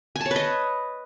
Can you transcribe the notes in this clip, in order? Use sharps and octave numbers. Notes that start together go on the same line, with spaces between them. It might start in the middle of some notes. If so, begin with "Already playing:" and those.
G#5
A5
C#5
B4
D#5